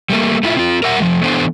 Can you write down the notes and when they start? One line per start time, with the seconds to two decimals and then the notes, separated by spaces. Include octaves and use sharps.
0.10 G3 A3 A#3
0.43 A3 E4 F4
0.57 C4 F4
0.83 A#4 E5 F#5
0.99 F3 G#3 A3
1.23 E3 B3 D4 A4 C5